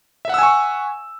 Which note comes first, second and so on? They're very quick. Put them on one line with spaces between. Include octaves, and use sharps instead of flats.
E5 F#5 E6 G#5 C#6